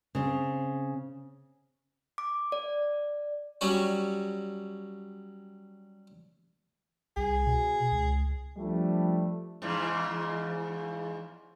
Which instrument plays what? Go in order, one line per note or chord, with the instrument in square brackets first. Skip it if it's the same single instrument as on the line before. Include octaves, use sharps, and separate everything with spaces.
[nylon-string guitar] C#3 C4
[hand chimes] D6
D5
[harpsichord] F#3 G3 C#4 F#4
[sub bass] C2 [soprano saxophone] G#4
[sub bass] B2
C#2
[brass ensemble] F3 G3 A3 D4
[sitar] E2 G#2 C#3